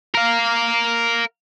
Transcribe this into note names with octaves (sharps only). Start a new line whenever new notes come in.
A#4 F5